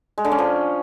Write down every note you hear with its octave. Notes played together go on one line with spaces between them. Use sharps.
G#3
D3
C#4
F3